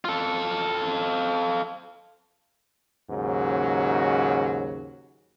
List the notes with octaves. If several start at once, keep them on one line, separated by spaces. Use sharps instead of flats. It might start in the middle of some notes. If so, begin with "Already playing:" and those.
F4 A4
D#2 G#2 C#3 F#3